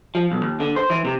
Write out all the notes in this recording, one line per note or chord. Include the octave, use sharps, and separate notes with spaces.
F3
B1
D#2
D3
C5
E3
C3